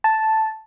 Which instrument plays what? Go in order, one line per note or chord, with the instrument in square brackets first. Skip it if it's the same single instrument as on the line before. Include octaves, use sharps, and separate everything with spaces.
[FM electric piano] A5